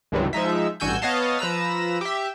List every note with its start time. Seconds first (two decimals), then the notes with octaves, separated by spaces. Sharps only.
0.12 C#2 G2 C3 D#3 E3 F#3
0.33 F3 G#3 D#4 E5
0.80 A1 G2 F#4 G#5 E6 G6
1.02 B3 C#5 D#5 F5 A5
1.39 F3 B4 A#5 E6
2.01 G4 E5